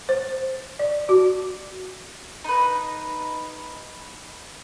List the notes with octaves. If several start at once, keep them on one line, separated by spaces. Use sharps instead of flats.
C5
D5
F#4
D#4 B4